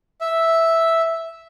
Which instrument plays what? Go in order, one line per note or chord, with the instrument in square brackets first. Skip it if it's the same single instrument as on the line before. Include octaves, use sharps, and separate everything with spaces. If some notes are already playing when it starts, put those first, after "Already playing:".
[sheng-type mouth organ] E5